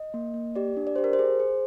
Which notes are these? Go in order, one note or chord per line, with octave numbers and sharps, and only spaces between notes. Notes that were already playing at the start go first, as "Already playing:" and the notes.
Already playing: D#5
A#3
A#3
G4 D5
D4
D5
G4 C5
A#4
C5
G#4
G#4